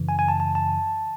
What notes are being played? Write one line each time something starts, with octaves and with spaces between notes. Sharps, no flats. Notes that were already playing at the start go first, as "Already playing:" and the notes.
Already playing: F#2 C#3 E3
G#5
G#5
A5
A5
A5